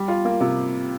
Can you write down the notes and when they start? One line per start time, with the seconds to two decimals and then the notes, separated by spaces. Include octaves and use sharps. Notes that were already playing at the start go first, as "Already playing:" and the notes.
Already playing: G3
0.08 F4
0.25 A#3
0.40 C3